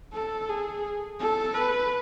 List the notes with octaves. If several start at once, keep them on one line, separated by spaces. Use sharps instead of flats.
A4
G#4
A4
B4